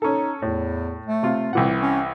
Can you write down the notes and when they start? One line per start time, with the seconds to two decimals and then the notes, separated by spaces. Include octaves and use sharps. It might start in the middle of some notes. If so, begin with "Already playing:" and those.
0.02 C#4 D#4 A4
0.42 E2 A2
1.06 A3
1.23 C3 F4
1.53 C2 A#2 E3 F#5
1.81 C#4